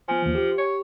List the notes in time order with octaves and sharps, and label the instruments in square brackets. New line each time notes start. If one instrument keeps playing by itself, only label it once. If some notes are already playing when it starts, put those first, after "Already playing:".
[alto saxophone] F3 [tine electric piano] B3 G#5
[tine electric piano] D#2 E3
G4
[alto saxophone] C#5